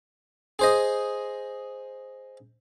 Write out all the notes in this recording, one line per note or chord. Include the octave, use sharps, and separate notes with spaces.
G#4 C5 D#5